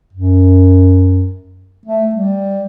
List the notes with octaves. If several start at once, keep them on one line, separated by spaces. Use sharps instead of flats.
F#2
A3
G3